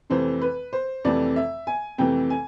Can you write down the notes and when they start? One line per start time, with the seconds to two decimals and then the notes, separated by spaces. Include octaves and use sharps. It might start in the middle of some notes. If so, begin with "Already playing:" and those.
0.10 F2 C3 E3 A3 C5
0.42 B4
0.73 C5
1.05 F2 C3 E3 A3 D5
1.36 E5
1.67 G#5
1.98 F2 C3 E3 A3 G5
2.30 G#5